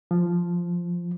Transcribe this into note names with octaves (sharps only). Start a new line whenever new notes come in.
F3